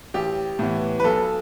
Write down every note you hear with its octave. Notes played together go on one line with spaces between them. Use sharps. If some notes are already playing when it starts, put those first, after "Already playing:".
A1 G4
A2 E3 B3
B4
B1 A4